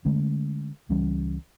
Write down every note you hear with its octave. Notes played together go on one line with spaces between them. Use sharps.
D3 G#3 A3 C#4
C#2 E3 G3 C#4